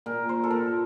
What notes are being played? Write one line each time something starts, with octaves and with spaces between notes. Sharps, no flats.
A#2 A#4
C5
A4
A#2 A#4